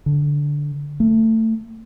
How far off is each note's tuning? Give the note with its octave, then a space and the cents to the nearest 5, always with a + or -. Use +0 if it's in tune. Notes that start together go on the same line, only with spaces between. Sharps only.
D3 -10
A3 +20